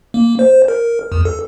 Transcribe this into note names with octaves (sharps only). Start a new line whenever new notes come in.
A#3
C5
A#4
E2
A4